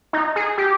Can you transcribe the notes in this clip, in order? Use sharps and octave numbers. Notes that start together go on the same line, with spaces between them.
D#4
G#4
G4